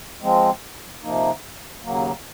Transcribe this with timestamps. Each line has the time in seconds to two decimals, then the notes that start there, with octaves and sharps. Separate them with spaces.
0.22 F3 G#3 C4
1.03 C3 F3 A#3 D#4
1.83 D#2 C#3 F#3 A#3